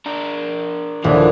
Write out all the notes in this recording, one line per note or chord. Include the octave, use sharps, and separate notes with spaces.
D4 A#4
D#1 D3 E3 F3 D4